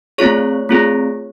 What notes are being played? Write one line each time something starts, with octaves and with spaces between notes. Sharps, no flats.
A3 C4 F4 G#4 C#5 C#6
A3 C4 F4 G#4